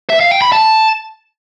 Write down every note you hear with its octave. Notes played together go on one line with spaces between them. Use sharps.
E5
F5
G5
B5
A5